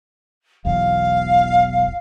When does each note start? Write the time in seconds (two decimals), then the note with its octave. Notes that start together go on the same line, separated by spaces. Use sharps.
0.65 E1 B1 E2 F5